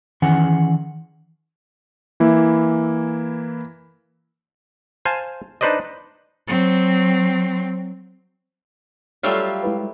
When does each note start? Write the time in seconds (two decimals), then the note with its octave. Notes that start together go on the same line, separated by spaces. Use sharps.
0.22 D#3 E3 C#4 G#4 F#5 G#5
2.20 E3 A#3 E4
5.05 C5 F5 G#5 A5
5.61 D4 D#4 B4 C5 D5 D#5
6.48 F#3 C4
9.23 F#3 G3 A3 F4 G4 A4 C#5 F5
9.63 G#3 E4 B4